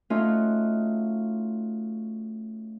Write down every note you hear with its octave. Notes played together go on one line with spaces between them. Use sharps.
A3 C#4 D#4 F4 F#4